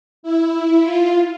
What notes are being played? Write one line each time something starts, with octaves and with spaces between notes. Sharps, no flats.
E4
F4